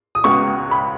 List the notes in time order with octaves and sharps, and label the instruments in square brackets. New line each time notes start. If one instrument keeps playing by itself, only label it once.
[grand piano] D#6
[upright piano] C#2 C#3 G#3 B3 F#4 [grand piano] C#6
[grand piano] B5